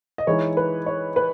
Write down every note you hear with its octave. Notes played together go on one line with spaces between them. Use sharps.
D#5
E3 G#3 D#4 C#5
B4
C#5
B4